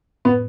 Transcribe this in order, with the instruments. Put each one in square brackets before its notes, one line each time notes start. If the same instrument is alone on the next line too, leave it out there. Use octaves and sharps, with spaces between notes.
[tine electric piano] A2 [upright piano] B3